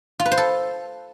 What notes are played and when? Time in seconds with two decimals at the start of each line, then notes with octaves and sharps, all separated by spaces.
0.20 F4
0.26 B4
0.31 C5
0.37 A4